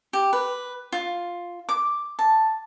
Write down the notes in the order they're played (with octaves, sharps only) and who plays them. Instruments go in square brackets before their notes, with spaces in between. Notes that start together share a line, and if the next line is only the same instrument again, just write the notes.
[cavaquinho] G4
B4
F4
D6
A5